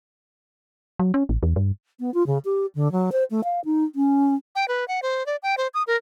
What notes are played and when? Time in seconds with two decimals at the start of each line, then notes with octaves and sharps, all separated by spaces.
0.99 F#3
1.14 C#4
1.29 A1
1.43 E2
1.56 G2
2.00 B3
2.14 F4
2.26 C#3
2.45 G4
2.75 D3
2.92 F#3
3.12 C5
3.31 A3
3.44 F5
3.65 D#4
3.95 C#4
4.55 G5
4.68 B4
4.88 F#5
5.03 C5
5.26 D5
5.43 G5
5.57 C5
5.74 D#6
5.87 A#4